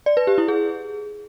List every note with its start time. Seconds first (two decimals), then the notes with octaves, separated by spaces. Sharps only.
0.06 D5
0.17 B4
0.27 G4
0.38 E4
0.48 G#4